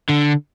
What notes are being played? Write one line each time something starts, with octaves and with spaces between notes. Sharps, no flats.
D3